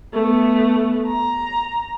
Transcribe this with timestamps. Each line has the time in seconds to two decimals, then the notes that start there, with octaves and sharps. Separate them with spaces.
0.13 A3 B3
1.07 A#5